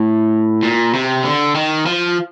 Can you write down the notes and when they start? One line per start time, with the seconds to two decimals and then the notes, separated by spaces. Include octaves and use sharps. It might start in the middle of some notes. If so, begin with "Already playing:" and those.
Already playing: A2
0.63 A#2
0.94 C3
1.24 D3
1.55 D#3
1.86 F3